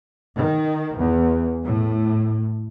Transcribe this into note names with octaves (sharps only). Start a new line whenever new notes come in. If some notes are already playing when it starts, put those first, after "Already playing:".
D#3
E2
A2